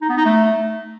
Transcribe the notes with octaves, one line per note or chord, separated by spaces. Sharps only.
D#4
B3
D#4
A3